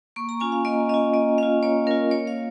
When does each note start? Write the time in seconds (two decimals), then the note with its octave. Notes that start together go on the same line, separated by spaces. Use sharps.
0.16 A#3 C#6
0.29 A#5
0.40 C#4 F4 G#5
0.52 F5
0.65 A#3 D#5
0.89 C#4 F4 D#5
1.13 A#3 D#5
1.38 C#4 F4 F5
1.63 A#3 C#5
1.87 C#4 F4 A#4
2.11 A#3 C#5
2.27 F5